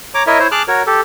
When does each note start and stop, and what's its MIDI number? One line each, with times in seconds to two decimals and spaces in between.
0.15 0.23 73
0.15 0.23 82
0.15 0.23 86
0.27 0.39 64
0.27 0.39 70
0.27 0.39 73
0.27 0.39 75
0.27 0.39 76
0.39 0.48 64
0.39 0.48 72
0.39 0.48 73
0.51 0.63 68
0.51 0.63 81
0.51 0.63 86
0.51 0.63 89
0.51 0.63 90
0.68 0.83 66
0.68 0.83 70
0.68 0.83 73
0.87 1.01 67
0.87 1.01 69